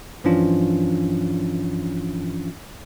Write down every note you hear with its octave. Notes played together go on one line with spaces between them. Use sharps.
G2 E3 F3 C#4 D4 F4